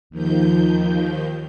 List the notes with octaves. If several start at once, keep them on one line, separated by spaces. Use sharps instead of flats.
D#2 D#3 F3 G6